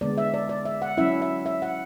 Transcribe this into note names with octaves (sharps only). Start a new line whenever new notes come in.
D3 G#3 B3 D5
E5
D5
D5
E5
F#5
F#3 C#4 E4 E5
E5
E5
F#5